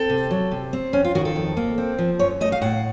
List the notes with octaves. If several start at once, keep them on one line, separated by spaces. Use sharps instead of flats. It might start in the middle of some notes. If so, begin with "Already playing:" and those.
Already playing: C4 A4
C3
F#3
C3
C4
F2 C#4
F4
D#3 F#4
A4
F2
A#3
C4
F3
F#2 C#5
A3 D#5
F5
A2 F#5